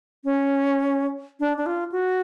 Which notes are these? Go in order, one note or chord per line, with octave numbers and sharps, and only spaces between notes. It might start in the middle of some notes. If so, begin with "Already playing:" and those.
C#4
D4
D4
F4
F#4